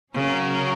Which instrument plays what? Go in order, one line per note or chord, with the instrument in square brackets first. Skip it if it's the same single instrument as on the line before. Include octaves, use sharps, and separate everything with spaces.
[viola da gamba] C#3 [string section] F#3 C#4 F#4 A#4